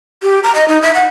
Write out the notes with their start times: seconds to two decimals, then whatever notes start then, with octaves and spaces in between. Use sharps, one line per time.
0.23 G4
0.44 A#5
0.55 D#5
0.68 D#4
0.82 E5
0.94 F#5